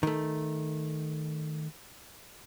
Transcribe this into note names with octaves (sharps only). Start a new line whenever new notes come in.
D#3 A3